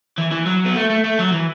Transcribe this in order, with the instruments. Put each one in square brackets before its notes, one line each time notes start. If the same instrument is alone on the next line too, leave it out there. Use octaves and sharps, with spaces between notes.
[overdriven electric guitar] E3
E3
F#3
B3
A3
A3
A3
F#3
E3